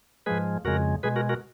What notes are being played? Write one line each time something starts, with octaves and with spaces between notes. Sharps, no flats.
G#2 F3 G#3 G#4 B4
F2 C#3 G#3 F#4 A#4
B2 G#3 G#4 B4
F#4 A#4
F#4 A#4